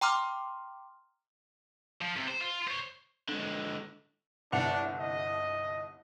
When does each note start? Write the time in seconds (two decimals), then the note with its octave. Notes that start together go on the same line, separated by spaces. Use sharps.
0.01 G5 A#5 C6 D6 F6
2.01 F3
2.17 C3
2.28 C5
2.41 F4
2.68 C5 C#5
3.29 D3 G#3
4.52 G1 C2 D4 F#5 F7
4.98 D#5